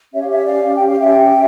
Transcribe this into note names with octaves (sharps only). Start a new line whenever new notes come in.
C#4 G4 C#5 E5
F5
C#5 E5
D5 F5
G5
F5
E5 G5